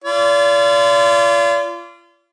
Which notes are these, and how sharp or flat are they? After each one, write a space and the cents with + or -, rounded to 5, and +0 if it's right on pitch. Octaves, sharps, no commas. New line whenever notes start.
F4 -35 D5 -35